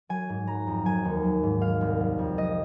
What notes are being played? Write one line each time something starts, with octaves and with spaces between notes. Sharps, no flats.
F#3 G#5
G#2
F#3 A#5
F2
F#3 G#5
D#2
F#3
G#2
F#3 F5
C2
F#3
F2
F#3 D#5